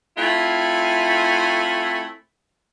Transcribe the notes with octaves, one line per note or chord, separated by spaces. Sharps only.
A3 C4 E4 F4 G#5